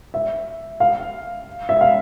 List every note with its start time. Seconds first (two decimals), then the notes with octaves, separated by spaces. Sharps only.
0.14 E5
0.80 F5
1.69 E5
1.81 F5